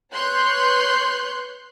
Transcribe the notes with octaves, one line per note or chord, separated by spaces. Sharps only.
B4 C#5 C6 F#6 G6